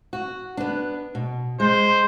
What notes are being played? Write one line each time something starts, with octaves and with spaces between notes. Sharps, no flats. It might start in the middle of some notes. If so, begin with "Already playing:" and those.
F#4
B3 D4
B2
G#3 C5